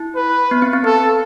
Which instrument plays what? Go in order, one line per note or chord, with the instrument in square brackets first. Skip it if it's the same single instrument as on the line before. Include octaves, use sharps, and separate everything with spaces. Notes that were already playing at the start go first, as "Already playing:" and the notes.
Already playing: [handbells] E4
[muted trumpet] B4
[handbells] B3
C4
C4
[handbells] C4 [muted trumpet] A4